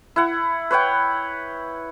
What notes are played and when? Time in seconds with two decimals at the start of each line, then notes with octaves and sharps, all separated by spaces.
0.16 E4 F#5
0.71 B4 C#5 F#5 G5